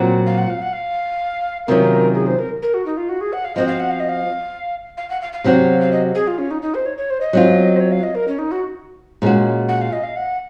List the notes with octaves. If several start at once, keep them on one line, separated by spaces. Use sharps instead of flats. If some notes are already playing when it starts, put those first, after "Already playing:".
Already playing: A#2 F#3 C4 F#4
F5
F#5
F5
F#5
F5
C3 D#3 F#3 C#4 F4 A#4
G#4
C5
A#4
A#4
F#4
D#4
F4
F#4
G#4
F#5
F5
F3 C4 F#4 D#5
F5
F#5
F5
D#5
F5
F5
F#5
F5
F5
C3 F#3 C4 F#4
F5
D#5
G#4
F4
C#4
D#4
D#4
C5
C#5
C#5
C5
D#5
F#3 C4 F4
C5
C#5
F5
D#5
A#4
C#4
D#4
F#4
A#2 G#3 C#4 F#4
F#5
F5
D#5
F5
F#5